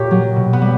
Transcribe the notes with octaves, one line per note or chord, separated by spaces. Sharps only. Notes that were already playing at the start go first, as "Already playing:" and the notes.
Already playing: A#2 G4 C#5
F#3
B2
B3
G3